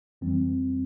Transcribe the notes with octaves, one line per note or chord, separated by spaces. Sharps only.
F2 E3 G3 C4